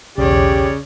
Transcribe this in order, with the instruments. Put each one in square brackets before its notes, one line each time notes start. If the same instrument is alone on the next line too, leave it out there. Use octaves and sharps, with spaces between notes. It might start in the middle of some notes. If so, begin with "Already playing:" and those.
[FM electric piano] B1 E2 [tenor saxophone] C#3 [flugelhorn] G4 [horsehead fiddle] C#5 D5